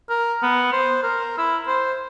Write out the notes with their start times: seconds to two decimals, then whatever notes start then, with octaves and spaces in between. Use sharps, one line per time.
0.09 A#4
0.43 B3
0.72 C5
1.03 A#4
1.38 E4
1.67 C5